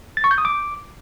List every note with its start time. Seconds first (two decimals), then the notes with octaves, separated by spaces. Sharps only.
0.17 A6
0.24 C#6
0.31 G6
0.38 D#6
0.45 D6